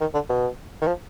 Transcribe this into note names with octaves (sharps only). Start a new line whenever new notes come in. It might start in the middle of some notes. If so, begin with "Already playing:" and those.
D#3
D3
B2
D#3
F3